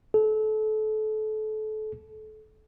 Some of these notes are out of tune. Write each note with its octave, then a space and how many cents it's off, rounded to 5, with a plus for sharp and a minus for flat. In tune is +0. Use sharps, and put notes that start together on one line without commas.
A4 -30